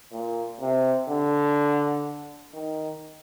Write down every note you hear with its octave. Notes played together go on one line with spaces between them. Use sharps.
A#2
C3
D3
D#3